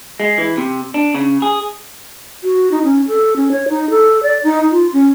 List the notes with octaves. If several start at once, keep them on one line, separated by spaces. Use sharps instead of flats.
G#3
E3
C3
D4
C#3
G#4
F#4
D#4
C#4
A4
C#4
C#5
D#4
A4
D5
D#4
F4
C#4